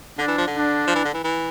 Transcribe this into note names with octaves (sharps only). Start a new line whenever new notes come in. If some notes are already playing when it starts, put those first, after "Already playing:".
D3 D4
E3
F3
D3
D4
F3
E3
D3
E3
E3